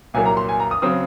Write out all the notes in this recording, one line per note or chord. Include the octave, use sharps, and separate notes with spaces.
C2 A#2 F#3 A#3 G#5
A#5
C6
G#5
A#5
D#6
C#3 F#3 C4 D#6